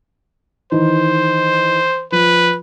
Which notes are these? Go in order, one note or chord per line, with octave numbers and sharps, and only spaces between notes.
D#3 E3 C5
F3 B4